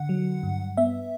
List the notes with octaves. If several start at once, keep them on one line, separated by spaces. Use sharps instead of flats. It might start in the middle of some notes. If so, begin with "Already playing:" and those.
Already playing: D3 F#5
F#3
G2
B3 E5